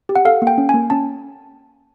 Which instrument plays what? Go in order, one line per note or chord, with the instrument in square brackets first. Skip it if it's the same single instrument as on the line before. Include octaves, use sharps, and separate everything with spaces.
[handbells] G4
F#5
A4 F5
A#3
G5
C#4
G#5
A#3
C#4 A5